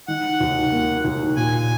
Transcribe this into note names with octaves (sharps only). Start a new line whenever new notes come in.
D#3 F#5
D#2
A#3
D#2
A#2 G#5